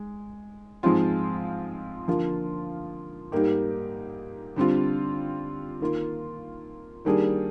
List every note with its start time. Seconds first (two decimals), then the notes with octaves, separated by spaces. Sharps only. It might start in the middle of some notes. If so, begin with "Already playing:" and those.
Already playing: G#3
0.83 G#2 F3 G#3 C4 F4
2.07 D3 F3 A#3 F4
3.32 G#2 G3 A#3 D#4 G4
4.56 D3 G3 C4 F4
5.81 D#3 A#3 F4
7.05 D#3 G3 A#3 D4 G#4